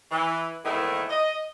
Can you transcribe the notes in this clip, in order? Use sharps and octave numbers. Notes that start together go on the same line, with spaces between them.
E3
E2 G#2 D#3 A3 A#3 E4
D#5